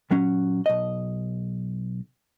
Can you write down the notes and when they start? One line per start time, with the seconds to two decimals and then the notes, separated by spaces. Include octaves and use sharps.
0.11 A#2 F#3 C#4
0.66 B1 D#5